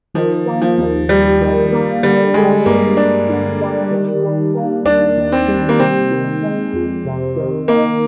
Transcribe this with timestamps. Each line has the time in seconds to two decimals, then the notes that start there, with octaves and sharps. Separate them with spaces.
0.14 D#3 F3
0.46 A#3
0.62 F3
0.78 D#2
1.09 D#2 G3
1.40 D#3
1.72 A#3
2.03 D3 G3
2.34 G3 G#3
2.66 G2 A#3
2.97 G2 D4
3.29 D3
3.60 G3
3.91 D#3
4.23 G3
4.54 A#3
4.85 D#2 D4
5.17 D#3
5.32 C4
5.48 G3
5.69 A#3
5.79 C3 C4
6.10 D#3
6.42 G#3
6.73 F2
7.05 C3
7.36 D#3
7.68 D#3 A#3